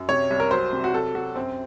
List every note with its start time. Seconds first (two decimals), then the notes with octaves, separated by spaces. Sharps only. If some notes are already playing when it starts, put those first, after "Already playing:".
Already playing: F#2
0.09 C3 C#5
0.30 C2
0.40 A#4
0.51 F#3 C5
0.73 C3
0.84 F#4
0.93 F#3 A4
1.14 F#3 F#4
1.36 F#2 C4